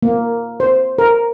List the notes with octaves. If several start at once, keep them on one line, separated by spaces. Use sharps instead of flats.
A#3
C5
A#4